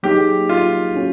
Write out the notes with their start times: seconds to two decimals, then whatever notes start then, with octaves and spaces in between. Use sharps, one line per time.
0.03 F#3 A#3 D#4 G4 G#4
0.49 F4
0.96 C#4 F#4